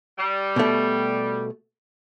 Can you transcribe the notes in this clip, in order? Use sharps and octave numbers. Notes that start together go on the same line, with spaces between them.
G3
B2 A3